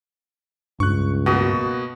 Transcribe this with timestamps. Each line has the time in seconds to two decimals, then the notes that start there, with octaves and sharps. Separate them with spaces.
0.80 C#2 G2 C#6 F#6
1.26 B2 A#3 F#4 D#6